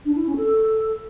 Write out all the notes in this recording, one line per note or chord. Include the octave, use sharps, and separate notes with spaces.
D4
E4
C#4
A4